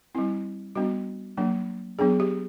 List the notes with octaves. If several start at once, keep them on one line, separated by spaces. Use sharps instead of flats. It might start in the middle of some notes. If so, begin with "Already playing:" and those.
G3 C4 E4
G3 B3 D4 F#4
F#3 A#3 D4
F#3 B3 D4 G#4
G4